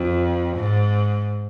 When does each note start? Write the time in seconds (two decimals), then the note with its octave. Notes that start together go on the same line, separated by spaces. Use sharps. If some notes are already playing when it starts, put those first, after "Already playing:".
Already playing: F2
0.57 G#2